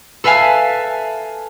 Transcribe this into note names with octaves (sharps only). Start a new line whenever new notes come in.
A4 B4 E5 F5 G#5 A5